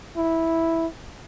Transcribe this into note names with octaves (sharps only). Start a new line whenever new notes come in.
E4